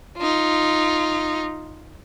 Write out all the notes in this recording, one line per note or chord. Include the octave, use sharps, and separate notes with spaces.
D#4 F4